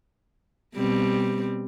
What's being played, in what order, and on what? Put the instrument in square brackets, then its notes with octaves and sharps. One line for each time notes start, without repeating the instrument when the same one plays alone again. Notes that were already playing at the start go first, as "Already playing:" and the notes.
[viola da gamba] B2 G3 C4